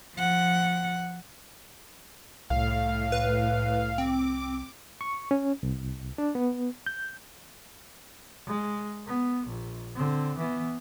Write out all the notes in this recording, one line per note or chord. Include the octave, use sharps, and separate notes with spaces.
F3 F#5
C2 A2 F5
B4
C4 D6
C#6
C#4
C2
D4
B3
G6
G#3
B3
A#1
D3 C4
E3 B3